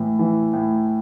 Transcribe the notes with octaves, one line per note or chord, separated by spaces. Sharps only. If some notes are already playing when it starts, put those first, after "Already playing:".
Already playing: A2 E3
E3
A2